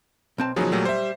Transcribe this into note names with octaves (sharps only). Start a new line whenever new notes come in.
B1 C4 A5
B2 D#3 F3 F#3 C#4 G#4
A#2 F#3 G3 A3
C5 E5